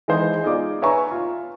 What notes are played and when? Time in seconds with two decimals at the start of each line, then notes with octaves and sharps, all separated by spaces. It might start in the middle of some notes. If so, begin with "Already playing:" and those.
0.08 E3 G#3 D#4 C5
0.44 D#4 F4 G#4 D5 D6
0.82 B4 C#5 E5 G#5 A#5 C#6
1.11 F4